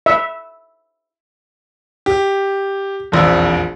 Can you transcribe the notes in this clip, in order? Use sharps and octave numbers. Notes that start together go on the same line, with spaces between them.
E5
G4
E1 A#1 F2